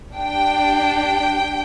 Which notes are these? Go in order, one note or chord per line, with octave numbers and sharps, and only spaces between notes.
D4 G4 G5